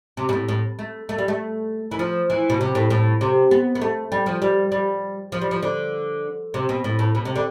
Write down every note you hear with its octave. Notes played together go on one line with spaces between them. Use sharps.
C3
B2
A2
A2
A3
A3
G3
A3
E3
F3
E3
B2
C3
A2
A2
C3
B3
B3
A3
G3
F3
G3
G3
F3
G3
F3
D3
C3
B2
A2
A2
B2
C3
D3